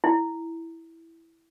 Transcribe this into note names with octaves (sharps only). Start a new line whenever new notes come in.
E4